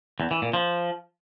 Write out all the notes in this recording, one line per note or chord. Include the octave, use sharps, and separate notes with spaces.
E2
E3
A#2
F3